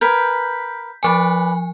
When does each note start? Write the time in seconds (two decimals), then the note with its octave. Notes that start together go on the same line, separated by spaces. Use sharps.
0.01 A#4 B4 G#5 G6 B6
1.03 F3 B4 D5 G#5 D6